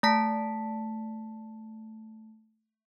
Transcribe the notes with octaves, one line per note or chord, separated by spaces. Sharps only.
A3 A5 B6